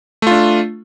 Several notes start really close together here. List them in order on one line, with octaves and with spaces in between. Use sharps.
A3 F4 D4